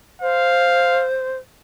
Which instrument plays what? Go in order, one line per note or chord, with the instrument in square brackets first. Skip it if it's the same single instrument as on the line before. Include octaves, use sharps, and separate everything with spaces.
[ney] C5 [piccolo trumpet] F5